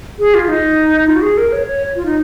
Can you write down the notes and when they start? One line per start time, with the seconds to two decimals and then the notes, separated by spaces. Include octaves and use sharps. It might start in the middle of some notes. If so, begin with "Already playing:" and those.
0.19 G#4
0.34 F4
0.48 D#4
1.08 F4
1.16 F#4
1.22 G#4
1.38 A#4
1.52 C#5
1.67 C#5
1.96 F4
2.06 D#4